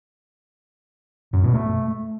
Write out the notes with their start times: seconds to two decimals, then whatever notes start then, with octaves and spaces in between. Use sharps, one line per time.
1.33 F#2
1.43 B2
1.53 A3